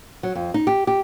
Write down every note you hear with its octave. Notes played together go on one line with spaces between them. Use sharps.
F#3
F2
D#4
G4
G4